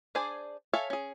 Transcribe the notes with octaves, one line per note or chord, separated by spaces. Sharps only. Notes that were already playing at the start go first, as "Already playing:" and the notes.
D4 G#4 C5 D5 G#5
A4 C#5 E5 F5 G#5
C#4 G#4